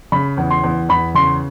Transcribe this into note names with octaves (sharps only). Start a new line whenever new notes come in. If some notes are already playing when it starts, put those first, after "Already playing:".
C#3 B5
E2
C6
E2
E2 B5
C#3 C6